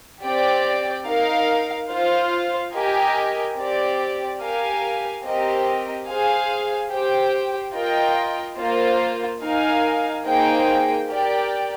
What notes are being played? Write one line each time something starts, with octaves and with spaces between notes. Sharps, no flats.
C4 G4 D5 G5
D#4 A#4 F5
F4 C5 F5
G4 A#4 D#5 G#5
C4 G4 D5
G4 A#4 F5 G#5
C4 G4 A#4 D#5
G#4 C5 F5 G#5
G4 C5 G5
F4 A#4 D#5 G5
A#3 F4 C5
D#4 A#4 F5 G#5
A#3 D#4 G#4 C5 G5
G4 A#4 D5 G5